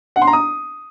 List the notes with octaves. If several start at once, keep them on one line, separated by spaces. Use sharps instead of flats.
F#5
C6
A#5
D#6